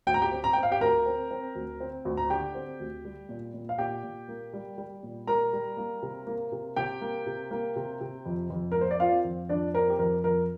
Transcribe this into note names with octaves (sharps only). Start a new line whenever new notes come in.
D2 G5
A#5
G4 G5
C4
A#5
C4 G5
F5
G4 G5
D2 A#4 A#5
C4
C4
D2
C4
D2
A#5
D3 G4 G5
C4
D2
G3
A#2
A#2
F5
A#2 G4 G5
A#2
A#3
G3
G3
A#2
G3 A#4 A#5
G3
A#3
C3
A#3
C3
C3 G4 G5
A#3
C3
A#3
C3
C3
F2
F2
A#3 A#4
C5
D5
C4 F4 F5
F2
F2 D4 D5
C4 A#4
G4
F2 A#4
F2 A#4